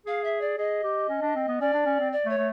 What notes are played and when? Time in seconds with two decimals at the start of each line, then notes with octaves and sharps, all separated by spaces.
0.06 G#4 F5
0.24 E5
0.41 D5
0.58 G#4 D#5
0.84 G4
1.09 C#4
1.22 D4
1.36 C4
1.48 B3
1.60 C#4 D5
1.73 D4
1.86 C#4
2.00 C4
2.12 D5
2.25 A3
2.29 C#5
2.38 A3